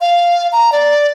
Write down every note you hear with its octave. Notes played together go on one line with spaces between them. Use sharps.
F5
A#5
D5